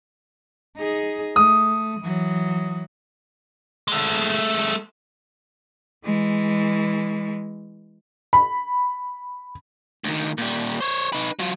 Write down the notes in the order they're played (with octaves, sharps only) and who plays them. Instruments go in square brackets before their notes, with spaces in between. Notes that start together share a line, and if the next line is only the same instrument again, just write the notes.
[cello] D#4 G#4
[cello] A3 [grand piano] D#6
[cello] E3 F#3
[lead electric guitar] G#3 A3
[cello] E3 G#3
[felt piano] B5
[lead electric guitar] D2 D#3
A#2 G3
C5 C#5
D#4 B4
F#3 F4